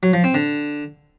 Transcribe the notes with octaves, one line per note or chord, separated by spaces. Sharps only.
F#3
F3
C4
D3